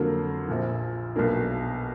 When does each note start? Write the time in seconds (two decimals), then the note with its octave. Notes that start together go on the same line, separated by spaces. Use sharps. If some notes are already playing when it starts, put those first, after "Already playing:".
Already playing: F2 D3 F#3 A#3
0.48 A#1 A#2 F3
1.15 B1 B2 A#3 D4